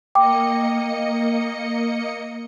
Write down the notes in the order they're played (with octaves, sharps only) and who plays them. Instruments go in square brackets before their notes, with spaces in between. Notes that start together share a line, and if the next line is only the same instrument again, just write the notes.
[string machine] A#3 D#5 C#7 [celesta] G5 D6